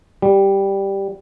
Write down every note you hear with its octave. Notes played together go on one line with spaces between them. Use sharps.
G3